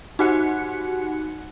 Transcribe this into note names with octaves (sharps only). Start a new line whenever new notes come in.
D#4 F#4 G4 F#5 F#6 C#7